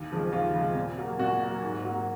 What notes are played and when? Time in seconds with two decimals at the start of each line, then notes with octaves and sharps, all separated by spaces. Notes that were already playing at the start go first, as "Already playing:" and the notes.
Already playing: D#2
0.11 C#3 F3 G#3
0.32 D#2 F4
0.54 C#3 F3 G#3
0.75 A#2
0.98 F#3 A#3
1.19 A#2 F#4
1.40 F#3 A#3
1.62 G#2
1.85 F#3 A#3